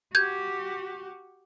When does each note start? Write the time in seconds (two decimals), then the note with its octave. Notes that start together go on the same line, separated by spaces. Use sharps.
0.15 F#4 G4 G6 G#6